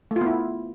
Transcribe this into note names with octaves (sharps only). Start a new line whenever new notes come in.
A3
F4
B3
E4